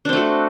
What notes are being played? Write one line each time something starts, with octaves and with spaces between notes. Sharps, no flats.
A3 C4 D4 F#4